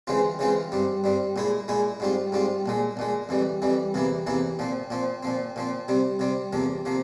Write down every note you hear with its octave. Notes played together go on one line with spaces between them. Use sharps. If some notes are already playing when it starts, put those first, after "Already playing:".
C#3 E3 G#3 C4 F4
C#3 E3 G#3 C4 F4
G2 G3 C4
G2 G3 C4
A#2 G#3 E4 G#4
A#2 G#3 E4 G#4
G#2 G3 C4 F4
G#2 G3 C4 F4
A#1 A#2 G#3
A#1 A#2 G#3
F2 E3 G3
F2 E3 G3
E2 C3 E3 A#3 E4
E2 C3 E3 A#3 E4
A#2 F3 C4
A#2 F3 C4
A#2 F3 C4
A#2 F3 C4
C3 G3 C4
C3 G3 C4
E2 C3 F3 A#3
C3 F3 A#3